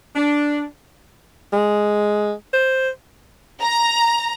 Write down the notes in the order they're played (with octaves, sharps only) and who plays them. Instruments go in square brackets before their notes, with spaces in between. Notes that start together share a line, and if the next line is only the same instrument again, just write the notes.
[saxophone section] D4
[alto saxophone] G#3
C5
[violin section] A#5